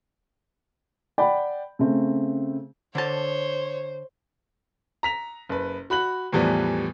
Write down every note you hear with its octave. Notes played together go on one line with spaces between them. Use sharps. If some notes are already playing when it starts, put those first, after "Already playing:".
D5 F#5 G5 B5
C#3 A3 C4
D3 C5 C#5 A5
A#5 B6 F7
F#1 B4
F#4 B5 F#6 F#7
E2 A2 E3 F3 G3 B3